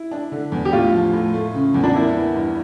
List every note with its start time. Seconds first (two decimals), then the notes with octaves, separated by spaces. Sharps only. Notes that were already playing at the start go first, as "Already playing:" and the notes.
Already playing: E4
0.11 D4
0.32 D3
0.52 E2
0.65 G4
0.72 A2 F4
0.93 F3
1.13 A2
1.34 A3
1.54 C#3
1.74 E2
1.84 D4
1.95 A#3 E4
2.15 E3
2.36 G2